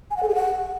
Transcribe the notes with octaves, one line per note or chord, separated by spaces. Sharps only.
G#5
F#5
A4
G#4
F#5